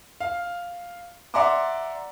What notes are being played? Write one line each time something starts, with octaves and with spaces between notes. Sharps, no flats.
F5
D5 E5 F#5 A#5 C6 D6